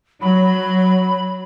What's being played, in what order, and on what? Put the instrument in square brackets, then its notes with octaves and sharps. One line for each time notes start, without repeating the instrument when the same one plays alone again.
[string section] F#3 [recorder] B5